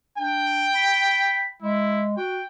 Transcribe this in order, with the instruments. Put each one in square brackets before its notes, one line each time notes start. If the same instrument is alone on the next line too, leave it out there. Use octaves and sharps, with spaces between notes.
[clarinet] D4 [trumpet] G5
[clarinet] B5
[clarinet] G#3 [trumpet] E4
[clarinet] F#4 [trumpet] G5